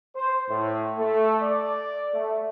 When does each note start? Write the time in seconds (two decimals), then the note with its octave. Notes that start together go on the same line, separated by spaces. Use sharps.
0.16 C5
0.48 A2
0.98 A3
1.42 D5
2.14 A3